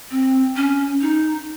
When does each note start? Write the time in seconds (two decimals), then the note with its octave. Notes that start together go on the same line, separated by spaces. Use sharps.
0.11 C4
0.57 C#4
1.01 D#4